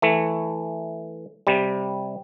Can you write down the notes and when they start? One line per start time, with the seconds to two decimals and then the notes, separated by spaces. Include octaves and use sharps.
0.02 E3 A3
1.47 C3 G3